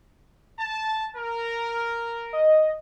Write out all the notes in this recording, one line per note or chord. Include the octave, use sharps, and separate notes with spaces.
A5
A#4
D#5